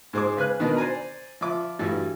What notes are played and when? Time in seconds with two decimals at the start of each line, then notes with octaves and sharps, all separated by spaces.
0.13 G#2 G#4 C5 C6 D6
0.37 C#3 B4 G#5 F#6
0.60 B2 D#3 B3 D4 A#4
0.77 C5 D5 G#5 A#5
1.41 F3 E5 D6
1.79 G2 E3 F#3 G3 A3